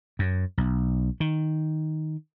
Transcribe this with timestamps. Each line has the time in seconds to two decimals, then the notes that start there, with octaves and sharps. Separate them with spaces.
0.19 F#2
0.57 B1
1.20 D#3